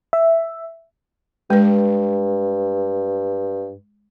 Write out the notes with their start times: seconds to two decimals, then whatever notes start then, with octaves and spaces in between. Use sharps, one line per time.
0.13 E5
1.50 G2 G#3 B4